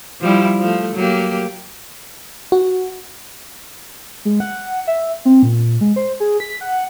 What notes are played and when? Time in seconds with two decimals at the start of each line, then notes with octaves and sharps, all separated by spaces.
0.21 F3 G3 E4
0.60 F3 A3
0.95 F#3 A#3 G4
2.52 F#4
4.25 G#3
4.40 F#5
4.87 E5
5.25 C4
5.43 A#2
5.81 G#3
5.96 C5
6.20 G#4
6.40 B6
6.61 F#5